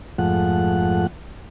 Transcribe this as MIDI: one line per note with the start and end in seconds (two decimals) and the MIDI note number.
0.18 1.07 41
0.18 1.07 44
0.18 1.07 53
0.18 1.07 57
0.18 1.07 78